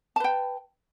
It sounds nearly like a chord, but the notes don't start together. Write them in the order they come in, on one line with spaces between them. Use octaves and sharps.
A5 B4 G5